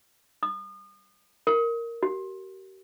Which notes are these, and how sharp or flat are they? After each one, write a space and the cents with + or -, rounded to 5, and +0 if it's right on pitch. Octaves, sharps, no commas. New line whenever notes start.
D#6 -35
A#4 -5
G4 -45